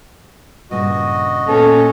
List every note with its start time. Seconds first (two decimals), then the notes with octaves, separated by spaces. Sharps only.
0.71 G2 A#2 C#3 F#4 D#5
1.48 A#2 B3 C#4 A4